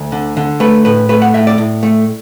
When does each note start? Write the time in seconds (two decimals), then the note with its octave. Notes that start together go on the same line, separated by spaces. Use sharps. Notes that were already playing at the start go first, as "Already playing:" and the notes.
Already playing: D2
0.12 D3
0.37 D3
0.60 A3 B4
0.85 A2 B4
1.09 A3 B4
1.22 F#5
1.34 A2 E5
1.47 D5
1.58 A2
1.83 A3